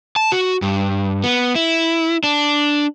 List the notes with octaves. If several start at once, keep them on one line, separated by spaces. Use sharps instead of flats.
A5
F#4
G2
B3
E4
D4